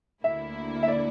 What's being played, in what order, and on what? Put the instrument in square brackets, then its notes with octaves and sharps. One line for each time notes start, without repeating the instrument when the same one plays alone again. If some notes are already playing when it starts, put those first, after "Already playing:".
[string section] D2 D3 A#3 E4 [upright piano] E5
[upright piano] E5
D5